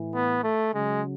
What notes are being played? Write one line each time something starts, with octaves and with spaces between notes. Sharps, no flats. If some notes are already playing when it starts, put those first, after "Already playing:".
Already playing: A2 E3
B3
A3
C#3 F#3 G#3